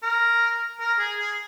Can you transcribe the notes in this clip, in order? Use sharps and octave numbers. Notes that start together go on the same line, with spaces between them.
A#4
A#4
G#4
G#4